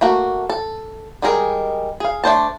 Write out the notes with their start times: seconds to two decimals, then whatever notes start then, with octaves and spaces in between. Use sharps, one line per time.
0.01 A3 A#3 F#4
0.50 A4
1.22 D#3 G3 G#3 G#4 A#4
2.00 G#4 F5
2.24 A3 D4 C5 A5